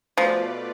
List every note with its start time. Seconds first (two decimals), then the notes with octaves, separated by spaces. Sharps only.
0.17 B2 F3 A3 F4 B4 D5